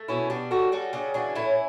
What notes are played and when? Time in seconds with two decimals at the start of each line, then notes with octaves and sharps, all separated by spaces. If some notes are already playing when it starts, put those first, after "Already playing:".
Already playing: A3
0.08 B2 C#4 E4
0.30 G3 D4 F#4
0.51 C#3 F#4 A4
0.72 G3 F#4 A4
0.93 C#3 D4 F#4
1.14 E3 D4 F#4
1.35 A2 C#4 E4